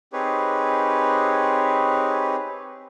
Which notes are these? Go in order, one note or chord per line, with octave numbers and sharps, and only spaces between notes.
C4 D#4 G4 G#4 B4 C#5